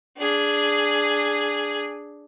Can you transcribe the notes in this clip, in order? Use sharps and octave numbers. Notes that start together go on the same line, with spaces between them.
D4 G#4